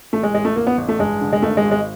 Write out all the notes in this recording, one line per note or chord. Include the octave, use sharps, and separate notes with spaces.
A1 A3
G#3
A1 G#3
A3
A1 A#3
B3
A1
A3
G2 G#3
D3
G#3
G#1 A3
G#3
G#1
G#3